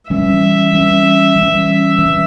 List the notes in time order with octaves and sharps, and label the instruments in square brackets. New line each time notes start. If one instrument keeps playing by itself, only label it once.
[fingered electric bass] E3 G3 C#4 [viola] E5
[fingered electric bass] E3 G3 C#4
E3 G3 C#4
E3 G3 C#4